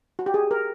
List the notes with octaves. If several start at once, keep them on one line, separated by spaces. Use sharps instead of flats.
F#4
G4
G#4
A#4